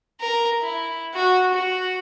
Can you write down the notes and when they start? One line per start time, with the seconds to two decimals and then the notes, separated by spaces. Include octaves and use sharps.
0.21 A#4
0.61 E4
1.14 F#4
1.54 F#4